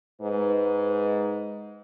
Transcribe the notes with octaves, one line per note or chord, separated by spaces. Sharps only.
G#2 B4